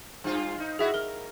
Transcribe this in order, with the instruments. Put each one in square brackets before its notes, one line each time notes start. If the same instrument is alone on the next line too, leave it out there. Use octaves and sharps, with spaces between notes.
[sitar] G2 F4
D#4
[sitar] E4 F#4 [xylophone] G#4 E5
[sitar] A#4 [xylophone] G7